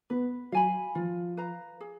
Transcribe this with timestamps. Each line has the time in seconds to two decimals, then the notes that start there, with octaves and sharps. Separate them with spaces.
0.10 B3 B4
0.52 F#3 F5 G#5 B5
0.95 F3 F4
1.37 B4 F5 A#5
1.81 G#4